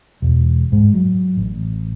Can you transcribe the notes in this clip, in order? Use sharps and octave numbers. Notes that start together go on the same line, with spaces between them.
E1
G#2
F#3
A1